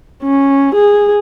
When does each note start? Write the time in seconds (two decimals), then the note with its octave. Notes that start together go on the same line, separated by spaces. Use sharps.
0.23 C#4
0.75 G#4